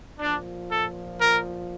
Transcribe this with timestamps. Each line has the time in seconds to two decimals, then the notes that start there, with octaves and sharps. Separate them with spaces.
0.19 A#2 F3 D4
0.70 A4
1.21 A#4